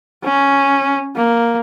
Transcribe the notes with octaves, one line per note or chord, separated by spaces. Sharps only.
C#4
A#3